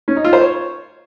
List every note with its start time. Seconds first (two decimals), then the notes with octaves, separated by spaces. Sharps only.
0.08 C#4
0.16 D#4
0.24 F4
0.33 C5
0.41 C#5